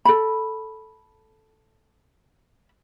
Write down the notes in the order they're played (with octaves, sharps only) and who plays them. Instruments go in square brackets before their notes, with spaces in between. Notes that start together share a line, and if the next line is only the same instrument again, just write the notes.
[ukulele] A4 B5